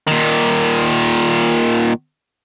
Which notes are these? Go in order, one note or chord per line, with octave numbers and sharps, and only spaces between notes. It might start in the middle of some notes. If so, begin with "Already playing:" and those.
A#2 D#3